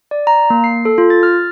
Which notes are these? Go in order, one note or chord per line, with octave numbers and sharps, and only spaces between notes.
D5
A#5
A#3
C7
A4
F4
A6
F6